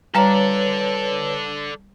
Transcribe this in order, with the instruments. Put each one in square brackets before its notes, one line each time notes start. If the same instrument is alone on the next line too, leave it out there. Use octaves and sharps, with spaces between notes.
[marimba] G3 [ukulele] F4 A5 A#5 [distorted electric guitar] A4 D5 [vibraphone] B4 C#5